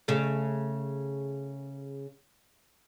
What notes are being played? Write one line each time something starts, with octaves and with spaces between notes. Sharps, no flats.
C#3 A3